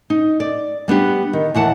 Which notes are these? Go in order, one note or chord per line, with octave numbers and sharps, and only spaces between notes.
D#4
D5
G3 B3 D4 G4
D#3
D#2 E3 F#5 A5